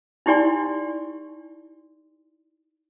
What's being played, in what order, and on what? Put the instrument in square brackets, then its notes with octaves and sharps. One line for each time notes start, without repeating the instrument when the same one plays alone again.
[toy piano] D#4 E4 G4 D5 G#5 C6